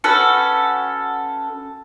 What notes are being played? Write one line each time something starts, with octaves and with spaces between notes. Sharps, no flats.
C#4 F#4 A4 B4